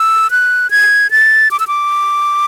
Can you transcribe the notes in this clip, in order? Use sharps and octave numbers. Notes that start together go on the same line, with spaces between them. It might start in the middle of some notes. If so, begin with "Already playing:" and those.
Already playing: E6
F#6
G#6
A6
D6
E6
D6